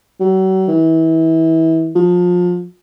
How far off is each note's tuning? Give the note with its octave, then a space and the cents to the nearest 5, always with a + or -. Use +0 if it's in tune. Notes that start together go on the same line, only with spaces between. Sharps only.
F#3 +40
E3 -30
F3 +30